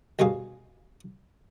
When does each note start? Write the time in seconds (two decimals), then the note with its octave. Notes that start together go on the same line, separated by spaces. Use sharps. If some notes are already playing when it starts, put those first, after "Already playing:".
0.19 D2 G2 B2 G#4 F5